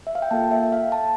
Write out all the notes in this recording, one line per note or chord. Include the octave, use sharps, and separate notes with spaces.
E5
F5
G5
A#3 F4 A4 A5
E5
F5
A5